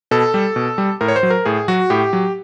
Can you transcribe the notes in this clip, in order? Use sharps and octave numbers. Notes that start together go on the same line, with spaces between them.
B2 A4
G3
B2
G3
A2 A#4
C#5
C5
F#3
A#4
A2 G#4
F#3 F#4
A2 G4
F#3